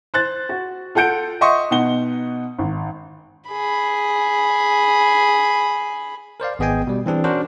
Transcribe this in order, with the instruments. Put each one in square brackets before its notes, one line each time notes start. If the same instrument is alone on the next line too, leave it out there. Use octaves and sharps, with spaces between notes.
[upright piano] C5 F#6 A6
F#4
F4 A4 F#5 G6 D7
D#5 E5 F#5 C6 C#6 D#6
B2 D#4 F#5 G7
G#1
[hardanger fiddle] G#4 B5
[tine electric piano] A#4 C5 D5 F5
G#1 B3 G#4 D#5 G5 G#5
B2 G3
E3 C4 D4 G#4
C#4 D4 F#4 A#4 C5